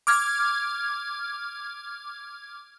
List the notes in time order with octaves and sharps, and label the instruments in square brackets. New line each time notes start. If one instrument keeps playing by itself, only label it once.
[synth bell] D6 F6 G#6